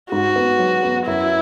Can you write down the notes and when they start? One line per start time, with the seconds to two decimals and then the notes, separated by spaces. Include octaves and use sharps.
0.12 G#2 F#4
0.36 B3
0.59 F#3
0.83 B3
1.07 F#2 E4